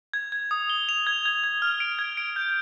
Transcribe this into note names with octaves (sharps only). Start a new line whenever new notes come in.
G#6
G#6
D#6
G7
F7
G#6
G#6
G#6
F6
D7
G#6
D7
G6